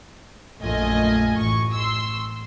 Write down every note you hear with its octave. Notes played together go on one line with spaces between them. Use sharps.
A#1 F#2 A3 F4 D#5 G#5
A1 C#6
C6 E6